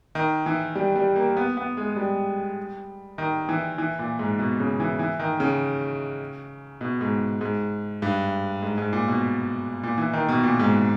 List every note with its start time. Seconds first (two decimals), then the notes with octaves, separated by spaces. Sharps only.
0.15 D#3
0.46 E3
0.75 G3
0.96 G3
1.16 A#3
1.37 B3
1.57 B3
1.77 G#3
1.96 G3
3.18 D#3
3.49 E3
3.78 E3
3.99 A#2
4.19 G#2
4.39 B2
4.59 C#3
4.80 E3
4.99 E3
5.19 D#3
5.40 C#3
6.81 B2
7.01 G#2
7.41 G#2
8.02 G2
8.62 G#2
8.78 G#2
8.93 A#2
9.08 B2
9.83 A#2
9.98 E3
10.13 D#3
10.29 B2
10.43 A#2
10.59 G#2